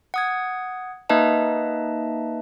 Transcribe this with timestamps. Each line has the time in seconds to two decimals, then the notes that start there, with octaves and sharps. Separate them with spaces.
0.14 F#5 D#6 G#6
1.09 A#3 D#4 B4 D#5 E5 A5